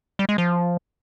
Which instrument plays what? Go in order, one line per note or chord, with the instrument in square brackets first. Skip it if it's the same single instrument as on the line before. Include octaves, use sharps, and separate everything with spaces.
[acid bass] G3
G#3
F3